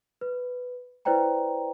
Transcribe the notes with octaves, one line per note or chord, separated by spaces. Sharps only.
B4
E4 B4 C5 D5 G5 A#5